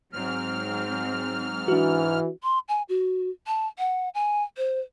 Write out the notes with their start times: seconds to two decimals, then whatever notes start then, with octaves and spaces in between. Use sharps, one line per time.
0.13 G#2 F#3 C4 F6
1.68 E3 D4 F#4
2.43 C6
2.69 G#5
2.89 F#4
3.47 A5
3.79 F#5
4.14 G#5
4.57 C5